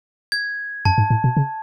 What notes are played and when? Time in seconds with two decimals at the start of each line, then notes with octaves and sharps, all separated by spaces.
0.32 G#6
0.85 F#2 A5
0.98 G#2
1.10 A2
1.24 B2
1.37 C#3